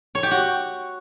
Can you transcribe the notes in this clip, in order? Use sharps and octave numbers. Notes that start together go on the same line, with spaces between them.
C#5
G4
F#4